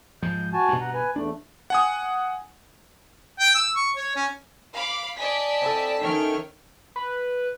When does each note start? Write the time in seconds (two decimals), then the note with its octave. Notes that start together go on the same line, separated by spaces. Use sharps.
0.23 G#2 F3 G#3 G6
0.53 F#4 G#5 A5
0.68 G2 B2
0.81 F#5 A#5
0.94 B4 G#5
1.16 E2 A3 D4
1.70 F#5 G#5 D#6
3.40 G5
3.55 E6
3.76 C#6
3.96 C#5
4.16 C#4
4.71 F5 B5 D6
5.16 D5 D#5 G#5 A5 B6
5.62 C4 E4 A4
6.01 D#3 C#4 C#5 G5 F6
6.96 B4